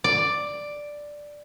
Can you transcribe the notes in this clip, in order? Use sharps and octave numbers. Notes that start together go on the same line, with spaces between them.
D5